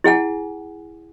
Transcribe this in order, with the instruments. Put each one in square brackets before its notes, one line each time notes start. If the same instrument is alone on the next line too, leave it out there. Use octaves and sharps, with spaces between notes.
[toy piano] E4 G#4 F#5 G#5